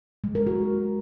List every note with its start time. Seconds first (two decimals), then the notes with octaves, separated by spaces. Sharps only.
0.24 G#3
0.35 A#4
0.47 F#4